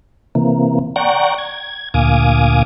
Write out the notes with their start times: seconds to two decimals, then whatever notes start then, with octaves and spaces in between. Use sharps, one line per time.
0.35 C3 E3 A#3
0.96 D5 F#5 G5 A#5 C#6
1.38 G#6
1.94 D2 A#2 F5 G#5 D6 D#6